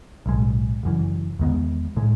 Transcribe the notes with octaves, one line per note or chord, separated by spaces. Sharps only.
B1 A2 G#3
F#1 F#2 E3
E2 D#3 G#3 B3
A2 G#3